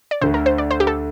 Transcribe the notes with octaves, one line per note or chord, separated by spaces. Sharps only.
D5
D2 D3 A3 C5
A#4
C5
D5
C5
G4
A4